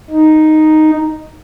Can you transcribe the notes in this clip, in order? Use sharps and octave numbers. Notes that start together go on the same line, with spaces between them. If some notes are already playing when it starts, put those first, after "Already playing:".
D#4